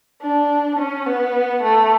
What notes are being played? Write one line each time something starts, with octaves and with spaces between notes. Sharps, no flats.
D4
C#4
B3
A3